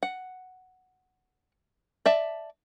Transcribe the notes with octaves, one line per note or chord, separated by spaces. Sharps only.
F#5
D5 E5 A5